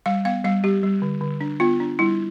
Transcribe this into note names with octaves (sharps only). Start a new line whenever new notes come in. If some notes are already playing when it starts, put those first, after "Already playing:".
G3 F5
B3 F5
G3 F5
G3 G4
G3
D3
D3
D4
B3 F4
D4
G3 E4